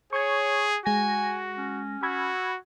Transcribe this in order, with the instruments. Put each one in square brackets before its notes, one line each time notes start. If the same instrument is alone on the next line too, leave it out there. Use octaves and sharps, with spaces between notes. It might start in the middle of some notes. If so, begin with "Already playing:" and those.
[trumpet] G#4 [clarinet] C#5 [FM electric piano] C#6 G#6
[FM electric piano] G#3 A#6 [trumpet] F#4 [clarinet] G#5
[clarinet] C#4
[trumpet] F#4 [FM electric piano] B5 E6 G#6